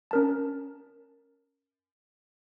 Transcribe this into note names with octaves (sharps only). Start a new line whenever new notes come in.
C#4 A#4 A5